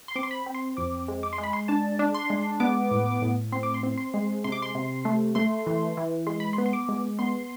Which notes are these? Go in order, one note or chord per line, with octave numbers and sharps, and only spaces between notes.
C6
C4 D6
C6
B5
C4
C6
F2 D6
G#3
D6
C6
G#3
B5
C6
D4 A5
D4
C6
G#3
B3 D6
A2
A2
C4 C6
D6
C6
C4
C6
G#3
C3 C6
D6
C6
C3
A3
A3 C6
E3
E3
G#3 C6
B5
C6
B3
C6
D6
G#3
B3 C6